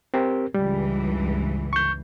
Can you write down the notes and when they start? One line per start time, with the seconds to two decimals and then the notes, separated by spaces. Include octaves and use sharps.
0.14 C4 G4 A#4
0.54 C#2 G2 E3 G3
1.73 C#6 G6